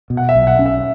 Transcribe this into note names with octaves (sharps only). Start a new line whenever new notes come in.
B2
F#5
E5
B1
F#5
C#4
E5